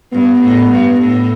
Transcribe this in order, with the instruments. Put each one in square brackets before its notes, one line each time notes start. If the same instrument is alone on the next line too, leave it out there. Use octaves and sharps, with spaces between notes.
[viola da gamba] G2 [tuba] B3
[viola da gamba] A2
G2
A2